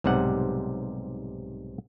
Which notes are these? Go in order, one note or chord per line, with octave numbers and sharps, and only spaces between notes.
B1 G#2 C3 G3 F#5